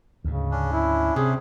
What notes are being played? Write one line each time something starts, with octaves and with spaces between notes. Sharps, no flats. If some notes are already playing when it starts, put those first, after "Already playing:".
D2 G#2 C#3
C#4 D4
E4
C3 G#4